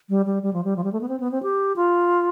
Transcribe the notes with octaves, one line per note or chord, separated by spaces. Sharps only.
G3
G3
G3
F3
G3
F3
G3
A3
B3
C4
B3
C4
G4
F4